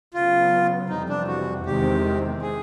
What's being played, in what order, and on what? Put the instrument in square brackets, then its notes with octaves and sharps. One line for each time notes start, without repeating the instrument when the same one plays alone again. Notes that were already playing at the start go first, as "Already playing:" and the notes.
[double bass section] C#3 F#3 B3 [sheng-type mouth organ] F4
[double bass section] F2 C3 E3 G3 C4 [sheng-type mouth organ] D#4
[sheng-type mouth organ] D4
F#4
[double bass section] E2 C3 D#3 G#3 C4 [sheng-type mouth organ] G4
[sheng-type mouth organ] G#4